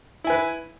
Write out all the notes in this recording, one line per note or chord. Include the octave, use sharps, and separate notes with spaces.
E4 B4 G#5